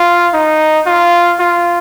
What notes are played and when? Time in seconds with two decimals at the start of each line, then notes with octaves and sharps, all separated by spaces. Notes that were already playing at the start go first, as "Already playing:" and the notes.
Already playing: F4
0.33 D#4
0.86 F4
1.39 F4